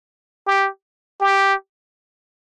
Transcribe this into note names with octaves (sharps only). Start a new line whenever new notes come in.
G4
G4